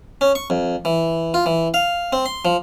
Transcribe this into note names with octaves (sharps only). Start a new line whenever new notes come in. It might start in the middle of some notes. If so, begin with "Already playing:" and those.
C#4
C#6
F2
E3
F4
E3
F5
C4
C6
F3